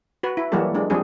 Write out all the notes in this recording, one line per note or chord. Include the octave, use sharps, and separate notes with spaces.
F#4 B4
E4
E3 F#3 G3 A#3 F#4 A4
G#3 D4
F3 G3 C4 D4 G#4